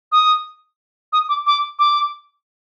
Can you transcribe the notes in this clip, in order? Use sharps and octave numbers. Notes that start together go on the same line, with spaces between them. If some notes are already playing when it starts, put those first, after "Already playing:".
D#6
D#6
D6
D6
D6